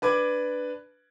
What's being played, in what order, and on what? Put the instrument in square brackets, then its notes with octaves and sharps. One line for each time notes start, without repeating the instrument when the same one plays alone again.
[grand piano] D4 B4 D6 G#6